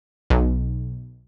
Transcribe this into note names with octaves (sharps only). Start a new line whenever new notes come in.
B1